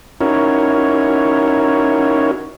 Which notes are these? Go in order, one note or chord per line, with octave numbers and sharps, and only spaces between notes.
C#4 D#4 E4 F#4 A#4 C#5